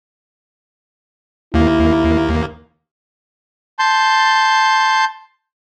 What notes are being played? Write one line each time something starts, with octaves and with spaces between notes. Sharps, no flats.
D#2 A#3 E4
A5 C6 G6